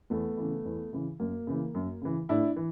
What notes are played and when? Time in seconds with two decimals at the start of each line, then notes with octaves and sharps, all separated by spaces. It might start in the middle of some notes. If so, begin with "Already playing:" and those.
0.10 E2 A3 B3
0.37 C#3 E3
0.65 E2
0.93 C#3 E3
1.20 F#2 A#3
1.47 C#3 E3
1.75 F#2
2.01 C#3 E3
2.29 A2 D4 E4
2.56 E3